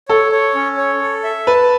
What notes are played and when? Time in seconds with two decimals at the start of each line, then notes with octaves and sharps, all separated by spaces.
0.08 A4 C#5
0.32 C#5
0.55 C#4
0.77 C#5
1.01 A4
1.24 E5
1.47 B4 A5